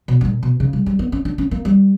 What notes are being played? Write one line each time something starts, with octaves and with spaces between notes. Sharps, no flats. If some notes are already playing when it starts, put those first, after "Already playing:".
B2
G2
A#2
B2
C#3
G3
G3
B3
C#4
D4
C#4
A#3
G3